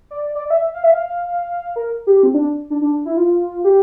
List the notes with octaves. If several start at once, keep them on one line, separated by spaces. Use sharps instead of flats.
D5
D5
D5
E5
F5
E5
F5
A#4
G4
C4
D4
D4
D4
E4
F4
G4